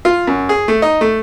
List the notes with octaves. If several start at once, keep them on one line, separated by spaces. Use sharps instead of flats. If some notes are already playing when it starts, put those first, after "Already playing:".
F4
F#2
G#4
A3
D#4
A3